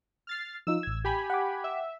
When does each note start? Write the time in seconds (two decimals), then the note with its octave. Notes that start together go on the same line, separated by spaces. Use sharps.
0.27 F6 A6 C7
0.67 F3 D#4 F4 E6
0.83 A1 G#6
1.04 G4 G#5 B5
1.30 F#5 G5 D6
1.64 E5